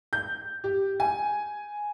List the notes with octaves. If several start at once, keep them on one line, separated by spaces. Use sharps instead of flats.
G6
G4
G#5